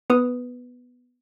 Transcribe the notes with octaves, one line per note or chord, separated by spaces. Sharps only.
B3 B4 D#6